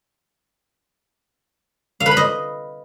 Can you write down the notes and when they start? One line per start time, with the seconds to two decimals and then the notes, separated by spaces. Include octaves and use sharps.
2.00 F5
2.06 B4
2.11 B5
2.17 D#5